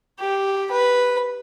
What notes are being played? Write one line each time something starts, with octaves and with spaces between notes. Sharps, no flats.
G4
B4